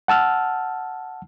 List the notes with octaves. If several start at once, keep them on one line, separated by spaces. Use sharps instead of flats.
F#5 A5 E6 F6